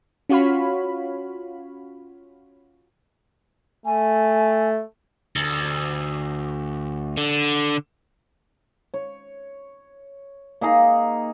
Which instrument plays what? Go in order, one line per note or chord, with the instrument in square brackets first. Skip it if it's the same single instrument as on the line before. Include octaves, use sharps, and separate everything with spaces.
[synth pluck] C#4 F4 F#4 C#5 F5 B5
[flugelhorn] A3 [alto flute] G#5
[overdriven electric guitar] D2
D3
[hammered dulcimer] C#5
A#3 D#4 G#4 A#5